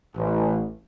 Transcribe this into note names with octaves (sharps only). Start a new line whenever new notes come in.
A1